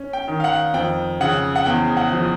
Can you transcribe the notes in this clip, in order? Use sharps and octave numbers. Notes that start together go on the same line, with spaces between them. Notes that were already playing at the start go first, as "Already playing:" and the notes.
Already playing: C#4
G5
D#3
F5
F#5
F2 G5
C#3 F#5
F#5
E2 G5
F#5
F3